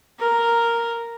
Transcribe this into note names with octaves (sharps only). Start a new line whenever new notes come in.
A#4